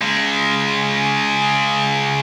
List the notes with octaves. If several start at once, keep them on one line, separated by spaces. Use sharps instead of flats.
C#3 G#3